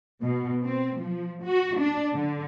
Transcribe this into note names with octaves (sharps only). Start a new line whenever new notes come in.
B2
C4
F3
F#4
D4
D3